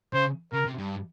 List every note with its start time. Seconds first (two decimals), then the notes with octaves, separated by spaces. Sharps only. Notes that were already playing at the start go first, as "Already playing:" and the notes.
0.13 C#3 C5
0.53 C#3 A#4
0.67 C3
0.79 G2